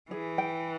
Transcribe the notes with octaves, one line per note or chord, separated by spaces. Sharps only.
E3 G#4
G5